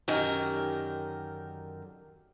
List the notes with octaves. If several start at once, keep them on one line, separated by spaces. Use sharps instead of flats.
F#2 D3 D#3 G4 A#4